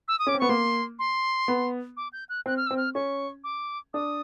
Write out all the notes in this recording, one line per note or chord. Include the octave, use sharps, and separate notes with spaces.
E6
D#6
C#4 D6
C4
B3 C#6
A#3 C6
C6
B3
D6
G6
F#6
C4 F#6
F6
C4 E6
F6
C#4 C#6
D6
D4 D#6